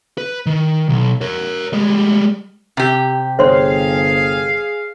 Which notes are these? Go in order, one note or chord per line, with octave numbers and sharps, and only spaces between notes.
B4
D#3
B1
A#4 C#5
G3 G#3
C3 G4
G1 G#4 C5 C#5 F5 C6